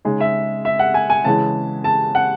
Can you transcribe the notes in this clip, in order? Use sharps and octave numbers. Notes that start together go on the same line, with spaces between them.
C#3 G#3 D#4
E5
E5
F#5
G#5
G#5
C#3 E3 G#3 A5
A5
F#5